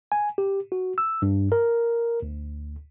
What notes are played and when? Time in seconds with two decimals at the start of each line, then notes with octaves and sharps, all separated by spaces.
0.12 G#5
0.38 G4
0.72 F#4
0.98 E6
1.22 G2
1.52 A#4
2.22 D2